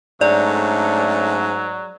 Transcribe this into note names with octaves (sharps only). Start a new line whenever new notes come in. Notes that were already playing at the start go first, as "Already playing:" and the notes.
G#2 F#3 A3 C#4 D4 D5